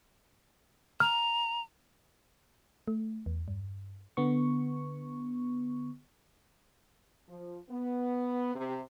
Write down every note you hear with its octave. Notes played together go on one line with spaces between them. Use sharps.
A#5 F6
A3
E2
G2
D3 B3 C#6
F3
B3
C3